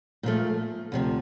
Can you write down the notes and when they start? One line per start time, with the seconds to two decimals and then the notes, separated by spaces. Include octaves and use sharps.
0.23 A#2 F3 A3
0.92 D2 C3 F3